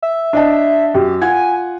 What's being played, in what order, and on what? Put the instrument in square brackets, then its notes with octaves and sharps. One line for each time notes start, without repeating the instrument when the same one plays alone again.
[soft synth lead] E5
[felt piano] D4 D#5 A5
[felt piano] F#2 [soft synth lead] G4
[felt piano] F4 F#5 G#6 [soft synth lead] G#5